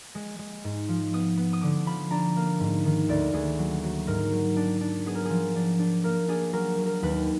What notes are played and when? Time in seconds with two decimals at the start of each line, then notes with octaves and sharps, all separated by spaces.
0.15 G#3
0.39 G#3
0.64 G#2
0.88 F3
1.13 B3 D#6
1.37 B3
1.53 D#6
1.61 D3 D6
1.86 F3 B5
2.11 D4 A#5
2.36 A#3
2.60 G#2
2.85 D#3
3.09 D2 D5
3.33 D2 G#4
3.59 F#3
3.83 F#3
4.07 G#2 A#4
4.32 F#3
4.56 D4
4.81 D4
5.06 B3 G#4
5.15 A#4
5.25 F3 G#4
5.55 D4
5.79 D4
6.04 A#3 A#4
6.28 D4 G#4
6.53 F#3 A#4
6.78 F#3
6.86 A#4
7.02 D#2 B4